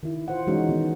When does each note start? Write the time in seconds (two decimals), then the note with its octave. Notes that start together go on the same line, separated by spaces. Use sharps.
0.03 D#3 E4
0.28 F4 C5 F#5
0.47 E3 G#3 C#4 D#4 F#4
0.69 D#3 B3